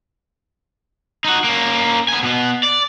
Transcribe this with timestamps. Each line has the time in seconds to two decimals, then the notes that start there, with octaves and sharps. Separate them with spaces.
1.25 D#4 F#4
1.44 A#3 C#4
2.08 B3 G#5
2.23 B2 B3
2.63 D5